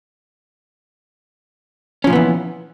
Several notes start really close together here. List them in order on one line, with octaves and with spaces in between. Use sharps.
C#4 F3 A#2 B3 E3